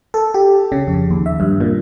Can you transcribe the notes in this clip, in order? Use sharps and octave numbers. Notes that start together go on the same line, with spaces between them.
A4
G4
C#3
F2
D#2
E5
G2
A#2